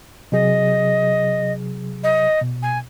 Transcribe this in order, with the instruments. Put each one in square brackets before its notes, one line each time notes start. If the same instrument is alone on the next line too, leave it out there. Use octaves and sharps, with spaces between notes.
[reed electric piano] C3 F#3 G#4 [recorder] D#5
[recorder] D#5
[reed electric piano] B2
[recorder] G#5